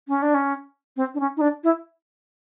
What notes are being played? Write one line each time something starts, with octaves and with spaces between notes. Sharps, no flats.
C#4
D4
C#4
C4
D4
C#4
D#4
D4
E4